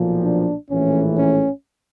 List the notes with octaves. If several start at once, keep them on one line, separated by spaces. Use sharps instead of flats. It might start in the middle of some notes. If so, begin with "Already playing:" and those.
Already playing: B1 A#2 F3
D4
A#1 A2 E3 A3 C#4
C#4